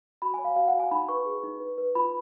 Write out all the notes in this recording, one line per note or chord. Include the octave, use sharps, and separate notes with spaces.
F#4 B5
C#5 G#5
F5
F#4 F5
F#5
F#4
G#5
D#4 B5
B4 C#6
G#4
D#4
B4
B4
F4 B5